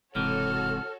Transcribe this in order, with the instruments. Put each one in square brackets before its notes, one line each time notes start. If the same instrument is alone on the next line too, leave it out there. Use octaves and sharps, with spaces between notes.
[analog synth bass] E1 [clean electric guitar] G#2 C3 E3 [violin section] F#4 A4 C#5 [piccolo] F6